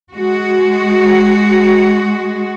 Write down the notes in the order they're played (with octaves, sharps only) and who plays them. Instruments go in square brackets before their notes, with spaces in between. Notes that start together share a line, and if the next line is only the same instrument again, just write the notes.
[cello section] G#3 F#4